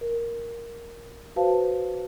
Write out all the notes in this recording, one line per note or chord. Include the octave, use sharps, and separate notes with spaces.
A#4
F#4 B4 C5 F5 A5